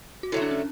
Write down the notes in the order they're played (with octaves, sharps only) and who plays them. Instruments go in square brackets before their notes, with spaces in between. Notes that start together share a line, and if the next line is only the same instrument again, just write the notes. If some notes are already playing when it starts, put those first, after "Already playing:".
[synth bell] F#4
[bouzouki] D3 F#3 A3 [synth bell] E4
[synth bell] D4
C#4